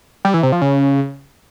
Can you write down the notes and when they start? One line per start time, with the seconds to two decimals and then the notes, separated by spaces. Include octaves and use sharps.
0.25 G3
0.34 E3
0.43 C3
0.52 F3
0.62 C#3